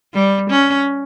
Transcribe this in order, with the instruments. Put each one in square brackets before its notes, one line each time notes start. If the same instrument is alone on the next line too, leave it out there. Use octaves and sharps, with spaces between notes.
[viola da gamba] G3
C#4